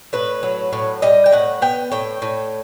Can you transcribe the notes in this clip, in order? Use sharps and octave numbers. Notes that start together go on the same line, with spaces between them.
A2 B4
F#3
A2
G3 D#5
G5
A2 F#5
B3 G5
A2 G5
A2